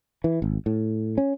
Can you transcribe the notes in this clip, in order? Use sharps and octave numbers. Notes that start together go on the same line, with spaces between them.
E3
G#1
A2
C#4